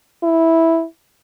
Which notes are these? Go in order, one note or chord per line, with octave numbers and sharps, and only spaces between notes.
E4